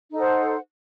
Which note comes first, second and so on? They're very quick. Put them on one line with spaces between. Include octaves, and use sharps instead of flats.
D#4 A4 F#5 C5